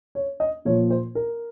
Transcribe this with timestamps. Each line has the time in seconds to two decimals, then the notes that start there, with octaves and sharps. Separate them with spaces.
0.15 C#5
0.40 D#5
0.65 A#2 F3 C#5
0.90 C5
1.15 A#4